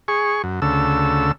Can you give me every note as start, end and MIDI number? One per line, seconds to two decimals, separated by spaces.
0.08 0.42 68
0.08 0.42 85
0.44 0.60 42
0.62 1.32 38
0.62 1.32 49
0.62 1.32 69
0.62 1.32 88